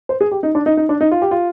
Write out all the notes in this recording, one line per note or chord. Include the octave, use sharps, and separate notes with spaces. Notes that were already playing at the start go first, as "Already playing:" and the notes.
C5
G#4
G4
D#4
D4
D#4
D#4
D4
D#4
F4
G4
F4